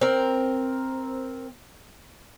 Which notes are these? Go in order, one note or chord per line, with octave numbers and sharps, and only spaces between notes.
C4 A#4